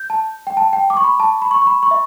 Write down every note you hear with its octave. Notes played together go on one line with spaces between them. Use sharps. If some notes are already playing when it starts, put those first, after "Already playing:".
Already playing: G6
A5
G5
A5
G5
D6
C#6
B5
A5
B5
C#6
C#6
B5
C#6
E5